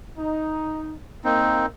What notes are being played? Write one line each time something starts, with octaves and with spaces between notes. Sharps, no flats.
D#4
A#3 C4 D#4